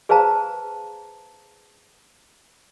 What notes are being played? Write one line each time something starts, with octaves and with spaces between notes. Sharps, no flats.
G#4 B4 C5 F5 A5 A#5